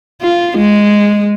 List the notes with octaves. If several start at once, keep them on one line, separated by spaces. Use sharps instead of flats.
F4
G#3